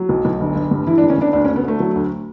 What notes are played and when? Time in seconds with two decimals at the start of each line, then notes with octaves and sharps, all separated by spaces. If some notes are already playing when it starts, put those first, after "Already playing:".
Already playing: F#3
0.09 B1
0.25 B1
0.41 G1
0.56 G1
0.71 G2
0.87 E3 E4
0.98 D4
1.02 G1
1.10 C#4
1.18 G1 D4
1.33 D2 D4
1.45 C#4
1.48 D2
1.56 B3
1.63 D3 A3
1.80 F#3
1.96 D2